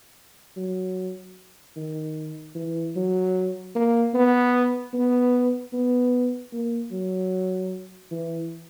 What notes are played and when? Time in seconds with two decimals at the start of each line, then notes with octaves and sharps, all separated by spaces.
0.57 F#3
1.76 D#3
2.55 E3
2.96 F#3
3.75 A#3
4.14 B3
4.94 B3
5.73 B3
6.52 A#3
6.92 F#3
8.11 E3